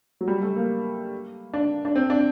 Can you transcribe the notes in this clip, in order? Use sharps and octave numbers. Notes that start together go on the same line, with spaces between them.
F#3
G3
A3
A#3
D4
D4
C4
D4